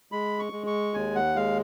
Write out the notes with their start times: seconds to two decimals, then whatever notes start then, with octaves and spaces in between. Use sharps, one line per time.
0.12 G#3 B5
0.39 C#6
0.53 G#3
0.67 C#6
0.94 D#2 G#5
1.15 F#5
1.36 G#3 F5